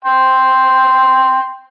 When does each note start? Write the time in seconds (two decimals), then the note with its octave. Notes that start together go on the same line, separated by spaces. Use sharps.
0.05 G5 C6